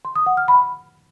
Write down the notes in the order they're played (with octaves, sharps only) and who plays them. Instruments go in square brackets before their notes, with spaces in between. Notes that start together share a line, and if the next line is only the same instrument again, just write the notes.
[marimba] C6
D#6
F#5
F6
B5